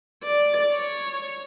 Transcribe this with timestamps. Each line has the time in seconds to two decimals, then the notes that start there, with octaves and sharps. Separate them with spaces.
0.24 D5
0.73 C#5